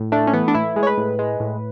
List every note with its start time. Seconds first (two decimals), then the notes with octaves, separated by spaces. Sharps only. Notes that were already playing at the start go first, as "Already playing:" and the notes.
Already playing: A2
0.12 A3 D4
0.27 C#4
0.33 E3 B3
0.48 D4
0.55 A2 E4
0.76 G#3
0.83 C#5
0.87 B4
0.98 A2
1.19 G#3
1.40 A2